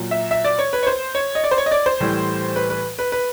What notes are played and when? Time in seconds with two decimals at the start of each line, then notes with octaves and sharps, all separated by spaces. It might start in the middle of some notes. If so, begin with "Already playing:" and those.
Already playing: A#2 F#3
0.11 E5
0.31 E5
0.44 D5
0.59 C#5
0.73 B4
0.83 C#5
0.87 C5
1.15 C#5
1.35 D#5
1.44 D5
1.51 C5
1.58 C#5
1.66 D#5
1.71 D5
1.86 C5
2.00 A2 E3 G3
2.56 B4
2.70 B4
2.99 B4
3.12 B4